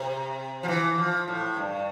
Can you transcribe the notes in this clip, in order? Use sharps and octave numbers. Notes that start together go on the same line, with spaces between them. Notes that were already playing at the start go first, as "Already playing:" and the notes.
Already playing: C3
F3
E3
F3
A2
G2